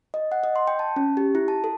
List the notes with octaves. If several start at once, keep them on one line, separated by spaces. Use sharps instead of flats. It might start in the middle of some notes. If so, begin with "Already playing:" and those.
D#5
F#5
D#5
C6
G5
A5
C#4
G4
E4
A5
A4